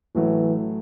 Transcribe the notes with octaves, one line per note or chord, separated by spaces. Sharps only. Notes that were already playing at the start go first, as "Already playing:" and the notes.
A1 A2 E3 F#3 A3